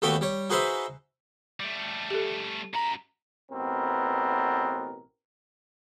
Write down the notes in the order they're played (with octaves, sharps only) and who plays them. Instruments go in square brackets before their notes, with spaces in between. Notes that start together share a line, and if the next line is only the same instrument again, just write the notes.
[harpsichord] D#2 A3 B3 F#4 B4 G5
G3 C#5
D#4 F#4 G#4 B4 C5 E5
[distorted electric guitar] G3 A3
[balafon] G4 A4
[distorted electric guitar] F#2 B5 [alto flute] A#5
[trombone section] A1 B2 B3 C4 A#4